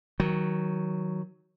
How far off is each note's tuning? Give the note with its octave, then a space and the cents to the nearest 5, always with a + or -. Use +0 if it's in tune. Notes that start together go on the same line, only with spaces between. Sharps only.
D#3 +20 F#3 +5